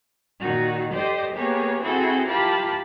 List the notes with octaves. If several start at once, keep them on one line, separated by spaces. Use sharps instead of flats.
A#2 D#3 D#4 F#4
G4 A4 C5 D5 D#5
A#3 B3 G4 G#4 C#5
C4 E4 F#4 G#4 A4 C5
E4 F4 G4 A#4 A5 B5